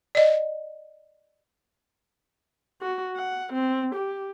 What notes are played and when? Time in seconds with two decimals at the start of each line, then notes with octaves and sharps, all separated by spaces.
0.15 D5 D#5
2.81 F#4
3.17 F#5
3.53 C4
3.95 G4